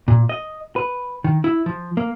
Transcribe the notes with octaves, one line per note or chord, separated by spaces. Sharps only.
A#2
D#5
B4
D#3
E4
F3
A#3